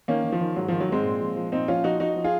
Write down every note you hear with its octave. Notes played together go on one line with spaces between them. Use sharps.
D#3 A#3 C#4
D#3
F3
D#3
G#2 F#3
D#3 F3
F#3
G#2 G#3 C4
A#2
F3
F3
A#2 C4 D#4
F3 C#4 F4
F3 D#4 F#4
F3 D#4 F#4
F3
F4 G#4